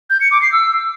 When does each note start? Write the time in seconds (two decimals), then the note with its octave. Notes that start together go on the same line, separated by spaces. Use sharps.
0.10 G6
0.21 C#7
0.31 D6
0.42 C7
0.52 E6